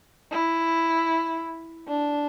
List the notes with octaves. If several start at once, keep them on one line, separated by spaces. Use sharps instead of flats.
E4
D4